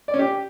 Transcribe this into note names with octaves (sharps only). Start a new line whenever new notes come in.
D5
C#4
G4